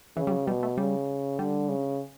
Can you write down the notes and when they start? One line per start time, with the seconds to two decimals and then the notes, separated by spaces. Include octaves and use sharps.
0.16 C#3 E3
0.27 G3
0.32 F#3
0.47 B2 G3
0.63 A3
0.78 C#3 G3
1.39 D3 G3
1.69 C#3